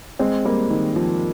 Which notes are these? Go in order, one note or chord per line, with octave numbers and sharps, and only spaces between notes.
G#3 C4
G3 A#3
D#3
F3